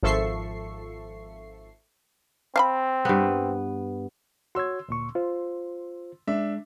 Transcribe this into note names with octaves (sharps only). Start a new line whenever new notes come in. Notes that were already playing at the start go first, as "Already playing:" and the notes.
G#1 F3 A4 E5 C#6 C7
C4 F5 A5 B5
G2 B3
F#4 C#5 C6 E6 G#6
D2 A#2 C#6
F4 C5
G#3 D4 E5